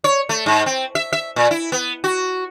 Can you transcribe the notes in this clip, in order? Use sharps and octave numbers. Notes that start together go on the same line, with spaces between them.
C#5
A3
G#2
C4
E5
E5
A#2
E4
B3
F#4